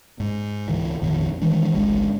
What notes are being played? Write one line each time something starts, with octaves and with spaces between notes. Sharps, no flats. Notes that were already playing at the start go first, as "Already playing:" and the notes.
G#2
C#2 D3 E3
A#1 F2 D3 D#3
D#3 E3 G#3 D4
G#1 C#2 G#3 D4